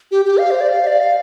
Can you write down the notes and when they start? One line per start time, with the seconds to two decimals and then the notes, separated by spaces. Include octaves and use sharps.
0.11 G4
0.25 G4
0.38 F5
0.51 C5
0.61 D5
0.69 F5
0.87 D5
1.00 F5